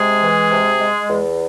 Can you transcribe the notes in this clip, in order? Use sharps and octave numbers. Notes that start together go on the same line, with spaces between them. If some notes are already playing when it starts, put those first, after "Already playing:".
Already playing: C3 G#3 G#4
E3
C3
G#3
E2